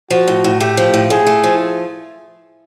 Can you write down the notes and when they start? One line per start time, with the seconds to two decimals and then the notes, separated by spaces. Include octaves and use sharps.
0.10 F3 F#4
0.27 A2
0.44 A2
0.60 A3 G4
0.77 F3
0.94 A2
1.10 A2 G#4
1.27 A3
1.44 F3